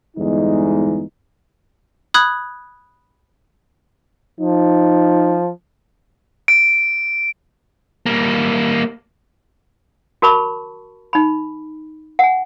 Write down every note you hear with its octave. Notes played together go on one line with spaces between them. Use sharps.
G1 E2 G#3 D#4
B5 D#6 F#6 G#6
F3 D#4
D7
G3 A#3
F#4 A#4 A5 B5 C#6 D6
D#4 B5
F#5 G#5